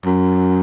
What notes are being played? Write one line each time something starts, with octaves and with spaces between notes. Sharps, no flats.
F#2